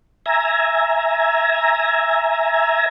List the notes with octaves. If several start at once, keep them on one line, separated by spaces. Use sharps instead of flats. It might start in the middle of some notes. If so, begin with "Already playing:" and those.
E5 G#5 A#5